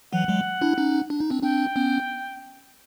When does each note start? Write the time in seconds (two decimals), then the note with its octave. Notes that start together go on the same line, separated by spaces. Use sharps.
0.12 E3 F#3 F#5
0.29 F#3 G#3
0.61 D4 E4
0.78 C#4 D#4
1.10 D4
1.20 D#4
1.30 C4 D4
1.43 C4 D4 G5
1.76 B3 C#4